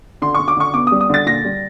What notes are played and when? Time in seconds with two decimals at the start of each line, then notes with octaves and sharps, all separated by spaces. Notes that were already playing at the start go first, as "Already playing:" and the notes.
0.22 D3 C6
0.34 D3 C#6
0.48 D6
0.57 D3 C#6
0.73 B3 D6
0.87 G3 D#6
1.01 D#6
1.09 D3 A6
1.26 A#2 A#6
1.44 G3